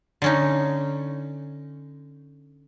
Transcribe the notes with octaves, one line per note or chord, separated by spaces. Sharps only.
D3 C#4 D#4